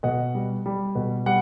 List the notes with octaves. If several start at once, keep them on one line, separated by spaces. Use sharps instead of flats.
B2 D#5 F#5
G3
G3
B2
G3 F#5